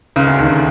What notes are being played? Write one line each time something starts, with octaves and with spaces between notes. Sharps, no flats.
C#2 C#3
D2 D3
D#2 D#3
D3